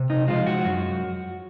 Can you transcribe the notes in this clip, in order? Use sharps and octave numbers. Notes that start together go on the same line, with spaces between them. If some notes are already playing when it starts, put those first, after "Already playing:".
Already playing: C3
D#4
F3 G#3 F4
F#4
F#2